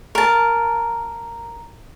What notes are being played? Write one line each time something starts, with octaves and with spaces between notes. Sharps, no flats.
A#4 A5